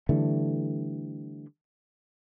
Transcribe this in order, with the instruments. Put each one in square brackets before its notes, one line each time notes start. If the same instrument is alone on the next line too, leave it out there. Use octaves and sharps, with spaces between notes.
[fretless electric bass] D3 E3 G3 A3